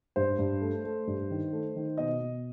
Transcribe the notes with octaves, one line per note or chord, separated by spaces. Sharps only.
G2 C5
G2
A3
A3
G2
D#3
A3
D#3
B2 D#5
B2